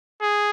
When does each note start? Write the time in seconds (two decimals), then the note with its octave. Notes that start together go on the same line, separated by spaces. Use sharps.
0.21 G#4